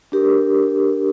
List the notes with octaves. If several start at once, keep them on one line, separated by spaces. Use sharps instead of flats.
D4 G4 A#4